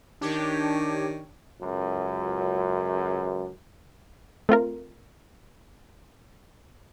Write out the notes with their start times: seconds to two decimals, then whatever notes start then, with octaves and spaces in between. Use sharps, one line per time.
0.21 D#3 D4 G4 C#5
1.61 C#2 F#2
4.49 A3 C4 F4 A#4